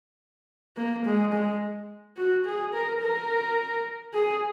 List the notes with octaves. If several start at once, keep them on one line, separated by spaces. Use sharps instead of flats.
A#3
G#3
G#3
F#4
G#4
A#4
A#4
G#4